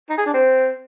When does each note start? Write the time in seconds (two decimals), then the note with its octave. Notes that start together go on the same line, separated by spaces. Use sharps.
0.09 D#4
0.17 G#4
0.26 D4
0.34 C4